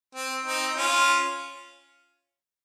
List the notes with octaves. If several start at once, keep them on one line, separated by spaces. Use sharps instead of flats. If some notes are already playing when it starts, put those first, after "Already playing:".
C4
C4 D#4
C#4 F4